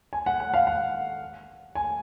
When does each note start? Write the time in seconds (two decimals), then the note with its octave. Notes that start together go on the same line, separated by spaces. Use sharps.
0.13 G#5
0.26 F#5
0.40 F#5
0.54 F5
0.67 F#5
1.75 G#5